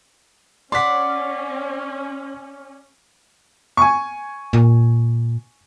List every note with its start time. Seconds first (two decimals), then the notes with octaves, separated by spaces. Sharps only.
0.72 C#4 D5 F#5 C6 B6
3.77 G#5 C#6
4.53 A#2